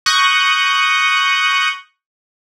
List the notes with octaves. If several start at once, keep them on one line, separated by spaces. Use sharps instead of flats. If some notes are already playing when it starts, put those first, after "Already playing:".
C#6 D#6 F#6 G6 A#6